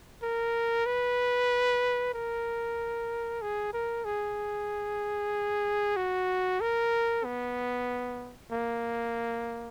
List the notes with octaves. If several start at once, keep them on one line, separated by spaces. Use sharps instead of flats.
A#4
B4
A#4
G#4
A#4
G#4
F#4
A#4
B3
A#3